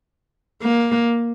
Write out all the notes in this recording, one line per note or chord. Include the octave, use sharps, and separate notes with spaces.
A#3